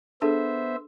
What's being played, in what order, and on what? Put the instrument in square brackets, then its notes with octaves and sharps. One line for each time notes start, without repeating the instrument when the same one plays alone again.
[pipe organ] B3 C5 E5 [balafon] D4 G#4 A4